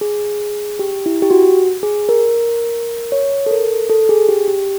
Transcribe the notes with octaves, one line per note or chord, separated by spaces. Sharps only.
G#4
G4
E4
G4
F#4
G#4
A#4
C#5
A4
A#4
A4
G#4
G4
G4